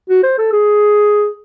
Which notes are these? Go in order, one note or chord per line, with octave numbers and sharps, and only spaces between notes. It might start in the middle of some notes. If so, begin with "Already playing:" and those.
F#4
C5
A4
G#4